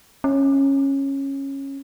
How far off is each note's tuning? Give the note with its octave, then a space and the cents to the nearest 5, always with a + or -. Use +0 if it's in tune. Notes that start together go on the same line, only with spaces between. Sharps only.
C#4 -15